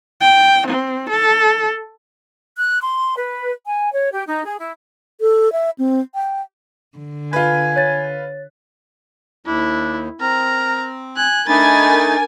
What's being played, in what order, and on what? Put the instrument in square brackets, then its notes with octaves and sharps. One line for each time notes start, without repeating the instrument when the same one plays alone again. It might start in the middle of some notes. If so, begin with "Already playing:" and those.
[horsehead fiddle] G5
C4
A4
[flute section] F#6
C6
B4
G#5
C#5
G4
D#4
G#4
E4
[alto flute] A4
E5
C4
G5
[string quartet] D3
[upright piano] F4 B4 [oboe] G#5
[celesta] C#5 A6
[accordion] D#2 [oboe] D4 [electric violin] E4
[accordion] C4 [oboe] A#4 [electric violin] A#5
[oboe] G#5 [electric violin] F#6
[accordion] A3 D#4 [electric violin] D4 A6 [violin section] A#4 G#5 [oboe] B5